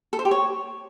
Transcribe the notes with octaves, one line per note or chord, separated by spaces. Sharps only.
A4
C5
G4
C#5